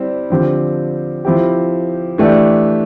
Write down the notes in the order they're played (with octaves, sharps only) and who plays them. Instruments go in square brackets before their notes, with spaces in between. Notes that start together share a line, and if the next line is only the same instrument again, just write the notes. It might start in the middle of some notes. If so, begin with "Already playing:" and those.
Already playing: [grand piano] G3 C4 E4
D3 F3 C4 G4
F3 C4 E4 G4
E3 A3 D4 G4